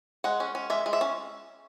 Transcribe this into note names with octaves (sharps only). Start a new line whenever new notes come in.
G#3 F#5
C#4
C#4
G#3 E5
G#3
E5
C#4